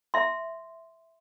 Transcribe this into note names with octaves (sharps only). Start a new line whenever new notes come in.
E5 C6